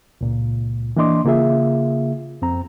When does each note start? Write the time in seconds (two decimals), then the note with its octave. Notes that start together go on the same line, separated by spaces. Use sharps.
0.21 C#2 A#2
0.97 E3 A#3 D4 D#5 C6 D6
1.25 C#3 A#3 F4 G#4 E5
2.42 F2 C4 A#5